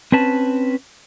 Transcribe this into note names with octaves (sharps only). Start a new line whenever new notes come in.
C4 C#4 B4 A5